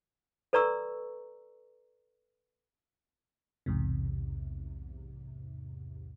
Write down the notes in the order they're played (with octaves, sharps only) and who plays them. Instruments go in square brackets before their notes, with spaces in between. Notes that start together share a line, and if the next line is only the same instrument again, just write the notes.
[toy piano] A4 B4 D5 A#5 C#6 E6
[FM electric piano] B1 E2 G#2 C3